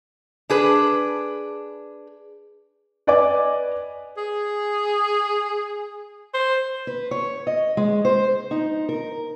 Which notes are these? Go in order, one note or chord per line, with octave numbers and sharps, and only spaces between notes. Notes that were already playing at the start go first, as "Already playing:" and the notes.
D4 G#4 B4
B4 D5 D#5 G#5 D6
G#4
C5
B4
C#5
D#5
G#3
C5
D#4
A#4